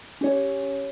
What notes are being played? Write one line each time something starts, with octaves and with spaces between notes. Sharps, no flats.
C#4 G4 C#5